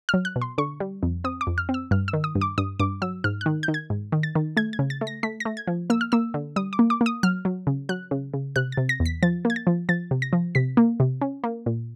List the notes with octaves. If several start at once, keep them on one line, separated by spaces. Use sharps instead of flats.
F#3 F6
F#6
B2
C6
D3 C#6
G3
F2
C4 D#6
D6
F2
F6
C4
E6
G2 F6
E6
D#3
D#6
G2
D6
G2 D#6
G2 D6
F#3 E6
G#2 F6
D#3 F#6
G6
D#3
G#6
G#2
D#3
A6
D#3
A3 G#6
G#6
C#3
A6
A3
A#6
A3 B6
A#6
A3
G#6
F3
A#3 E6
F6
A#3 E6
D3
G3 D#6
D6
A#3
D6
A#3
D#6
F#3 F6
F#3
C#3
F#3 F#6
C#3
C#3
C3 F#6
A6
C3
A#6
E2
B6
F3 A6
A#3
G#6
A6
F3
F3 A6
C3
A#6
F3
C3 B6
A#3
C3
C#4
A#3
A#2